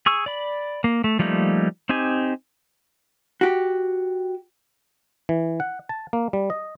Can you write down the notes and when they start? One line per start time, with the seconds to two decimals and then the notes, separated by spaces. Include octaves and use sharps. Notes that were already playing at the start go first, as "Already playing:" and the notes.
0.06 G#4 C#6 E6
0.26 D5 B5
0.84 A#3
1.04 A3
1.19 F3 G3 A3 A#3 D#4
1.89 C4 D#4 G4 G#5
3.41 F#4 G4
5.29 E3
5.60 F#5
5.89 A5
6.13 A#3
6.33 G3
6.50 D#5